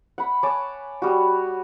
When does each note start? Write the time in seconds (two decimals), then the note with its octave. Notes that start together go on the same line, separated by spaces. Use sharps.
0.18 F#5 B5
0.43 C#5 G#5 A5 D6
1.02 G3 F#4